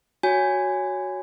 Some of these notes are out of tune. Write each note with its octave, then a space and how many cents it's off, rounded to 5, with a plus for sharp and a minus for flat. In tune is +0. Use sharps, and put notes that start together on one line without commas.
F#4 +0 C#5 +10 G#5 -5